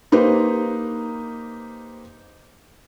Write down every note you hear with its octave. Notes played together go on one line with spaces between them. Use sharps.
A#3 D#4 G4 B4 C5